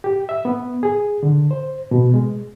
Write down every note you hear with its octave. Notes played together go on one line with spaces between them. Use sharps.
G4
E5
B3
G#4
D3
C5
B2
G#3